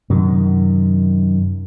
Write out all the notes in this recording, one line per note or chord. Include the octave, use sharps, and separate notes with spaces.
F#2 C3 D#3